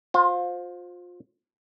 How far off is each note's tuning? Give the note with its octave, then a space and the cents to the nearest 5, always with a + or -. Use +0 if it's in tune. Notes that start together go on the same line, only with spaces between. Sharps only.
F4 +30 C5 +5